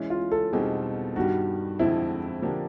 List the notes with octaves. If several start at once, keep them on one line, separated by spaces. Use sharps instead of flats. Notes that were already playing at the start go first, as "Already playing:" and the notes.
Already playing: E3 G#3 C#4
F4
A4
E2 B2 G3 C4 D#4 G#4
G2 D#3 G3 F#4
F2 D3 F3 G#3 C4 E4
D3 F3 A#3 D4 G4